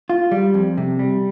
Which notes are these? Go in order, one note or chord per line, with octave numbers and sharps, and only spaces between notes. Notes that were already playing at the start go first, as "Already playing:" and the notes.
F4
G3
F2
C3
G3